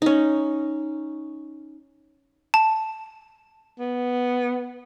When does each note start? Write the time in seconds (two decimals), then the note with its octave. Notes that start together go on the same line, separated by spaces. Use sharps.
0.02 C#4 D#4
2.54 A5
3.79 B3